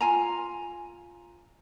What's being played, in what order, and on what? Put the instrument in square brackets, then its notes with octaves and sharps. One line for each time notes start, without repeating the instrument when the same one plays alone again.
[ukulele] F4 G#5 A#5